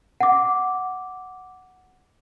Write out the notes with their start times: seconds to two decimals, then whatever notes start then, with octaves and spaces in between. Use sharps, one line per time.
0.21 F#5 D6